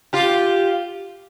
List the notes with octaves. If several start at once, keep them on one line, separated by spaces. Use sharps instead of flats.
F4 G4